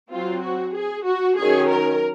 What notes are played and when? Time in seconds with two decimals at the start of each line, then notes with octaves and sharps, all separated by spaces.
0.11 F#3 C4 F4
0.43 F#4
0.75 G#4
1.06 F#4
1.38 D#3 F#3 C#4 G#4
1.70 A#4